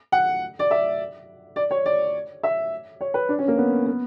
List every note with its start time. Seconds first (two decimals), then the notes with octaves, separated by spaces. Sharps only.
0.12 F#5
0.59 D5
0.71 E5
1.56 D5
1.71 C#5
1.86 D5
2.43 E5
3.01 C#5
3.14 B4
3.29 D4
3.39 C#4
3.48 A#3
3.58 B3
3.86 B3